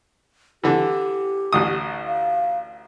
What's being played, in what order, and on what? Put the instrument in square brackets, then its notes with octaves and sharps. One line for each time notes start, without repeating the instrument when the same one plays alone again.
[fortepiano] D3 E3 [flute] G4
[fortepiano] A1 D2 D#6
[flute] F5